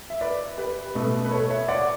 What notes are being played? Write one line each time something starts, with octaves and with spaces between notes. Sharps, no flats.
E5
B4 D5
G4 B4
B2 A3
B4
A4 C#5
C#5 E5
D5 F#5